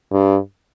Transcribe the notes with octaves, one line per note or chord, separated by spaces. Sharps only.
G2